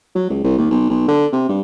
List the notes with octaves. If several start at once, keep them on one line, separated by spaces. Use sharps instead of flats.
F#3
C#2
C2
D#2
B1
B1
D3
C3
G2